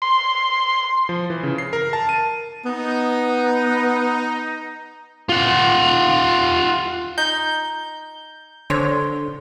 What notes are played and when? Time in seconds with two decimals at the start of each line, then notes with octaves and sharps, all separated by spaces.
0.02 C6
1.09 F3
1.30 E3
1.43 C#3
1.58 C7
1.73 A#4
1.93 A5
2.09 D#7
2.65 B3 D#4
5.29 F4 F#5
7.18 D#4 G6
8.70 D3 C5 C#5